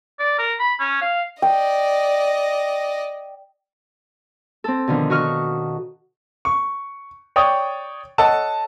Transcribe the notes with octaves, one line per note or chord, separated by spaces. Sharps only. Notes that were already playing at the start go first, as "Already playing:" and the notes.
D5
A#4
B5
C#4
F5
D5 D#5 G5
C4 A4
B2 D3 D#3 F3
F#4 D#5 C#6 F6
C#6
C#5 D5 G5 C#6 D#6
A4 C#5 D#5 F#5 A5 E6